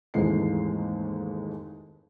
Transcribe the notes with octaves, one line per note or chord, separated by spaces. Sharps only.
F1 D#2 G#2 E3 G#3 C7